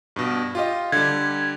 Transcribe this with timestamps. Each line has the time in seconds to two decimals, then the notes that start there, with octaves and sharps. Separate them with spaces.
0.16 G2 B2
0.55 F4 G4 D#5
0.92 D3 G3 G#6